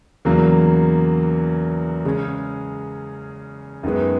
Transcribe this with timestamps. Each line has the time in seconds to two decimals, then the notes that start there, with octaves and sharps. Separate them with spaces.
0.25 E2 C#3 F#3 A#3
2.05 C#3 G#3 C#4
3.83 F#2 D#3 G#3 B3